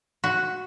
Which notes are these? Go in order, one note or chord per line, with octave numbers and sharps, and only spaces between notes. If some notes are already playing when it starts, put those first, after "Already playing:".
F#4